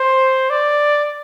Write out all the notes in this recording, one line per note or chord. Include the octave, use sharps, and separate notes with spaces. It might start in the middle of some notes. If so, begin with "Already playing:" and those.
Already playing: C5
D5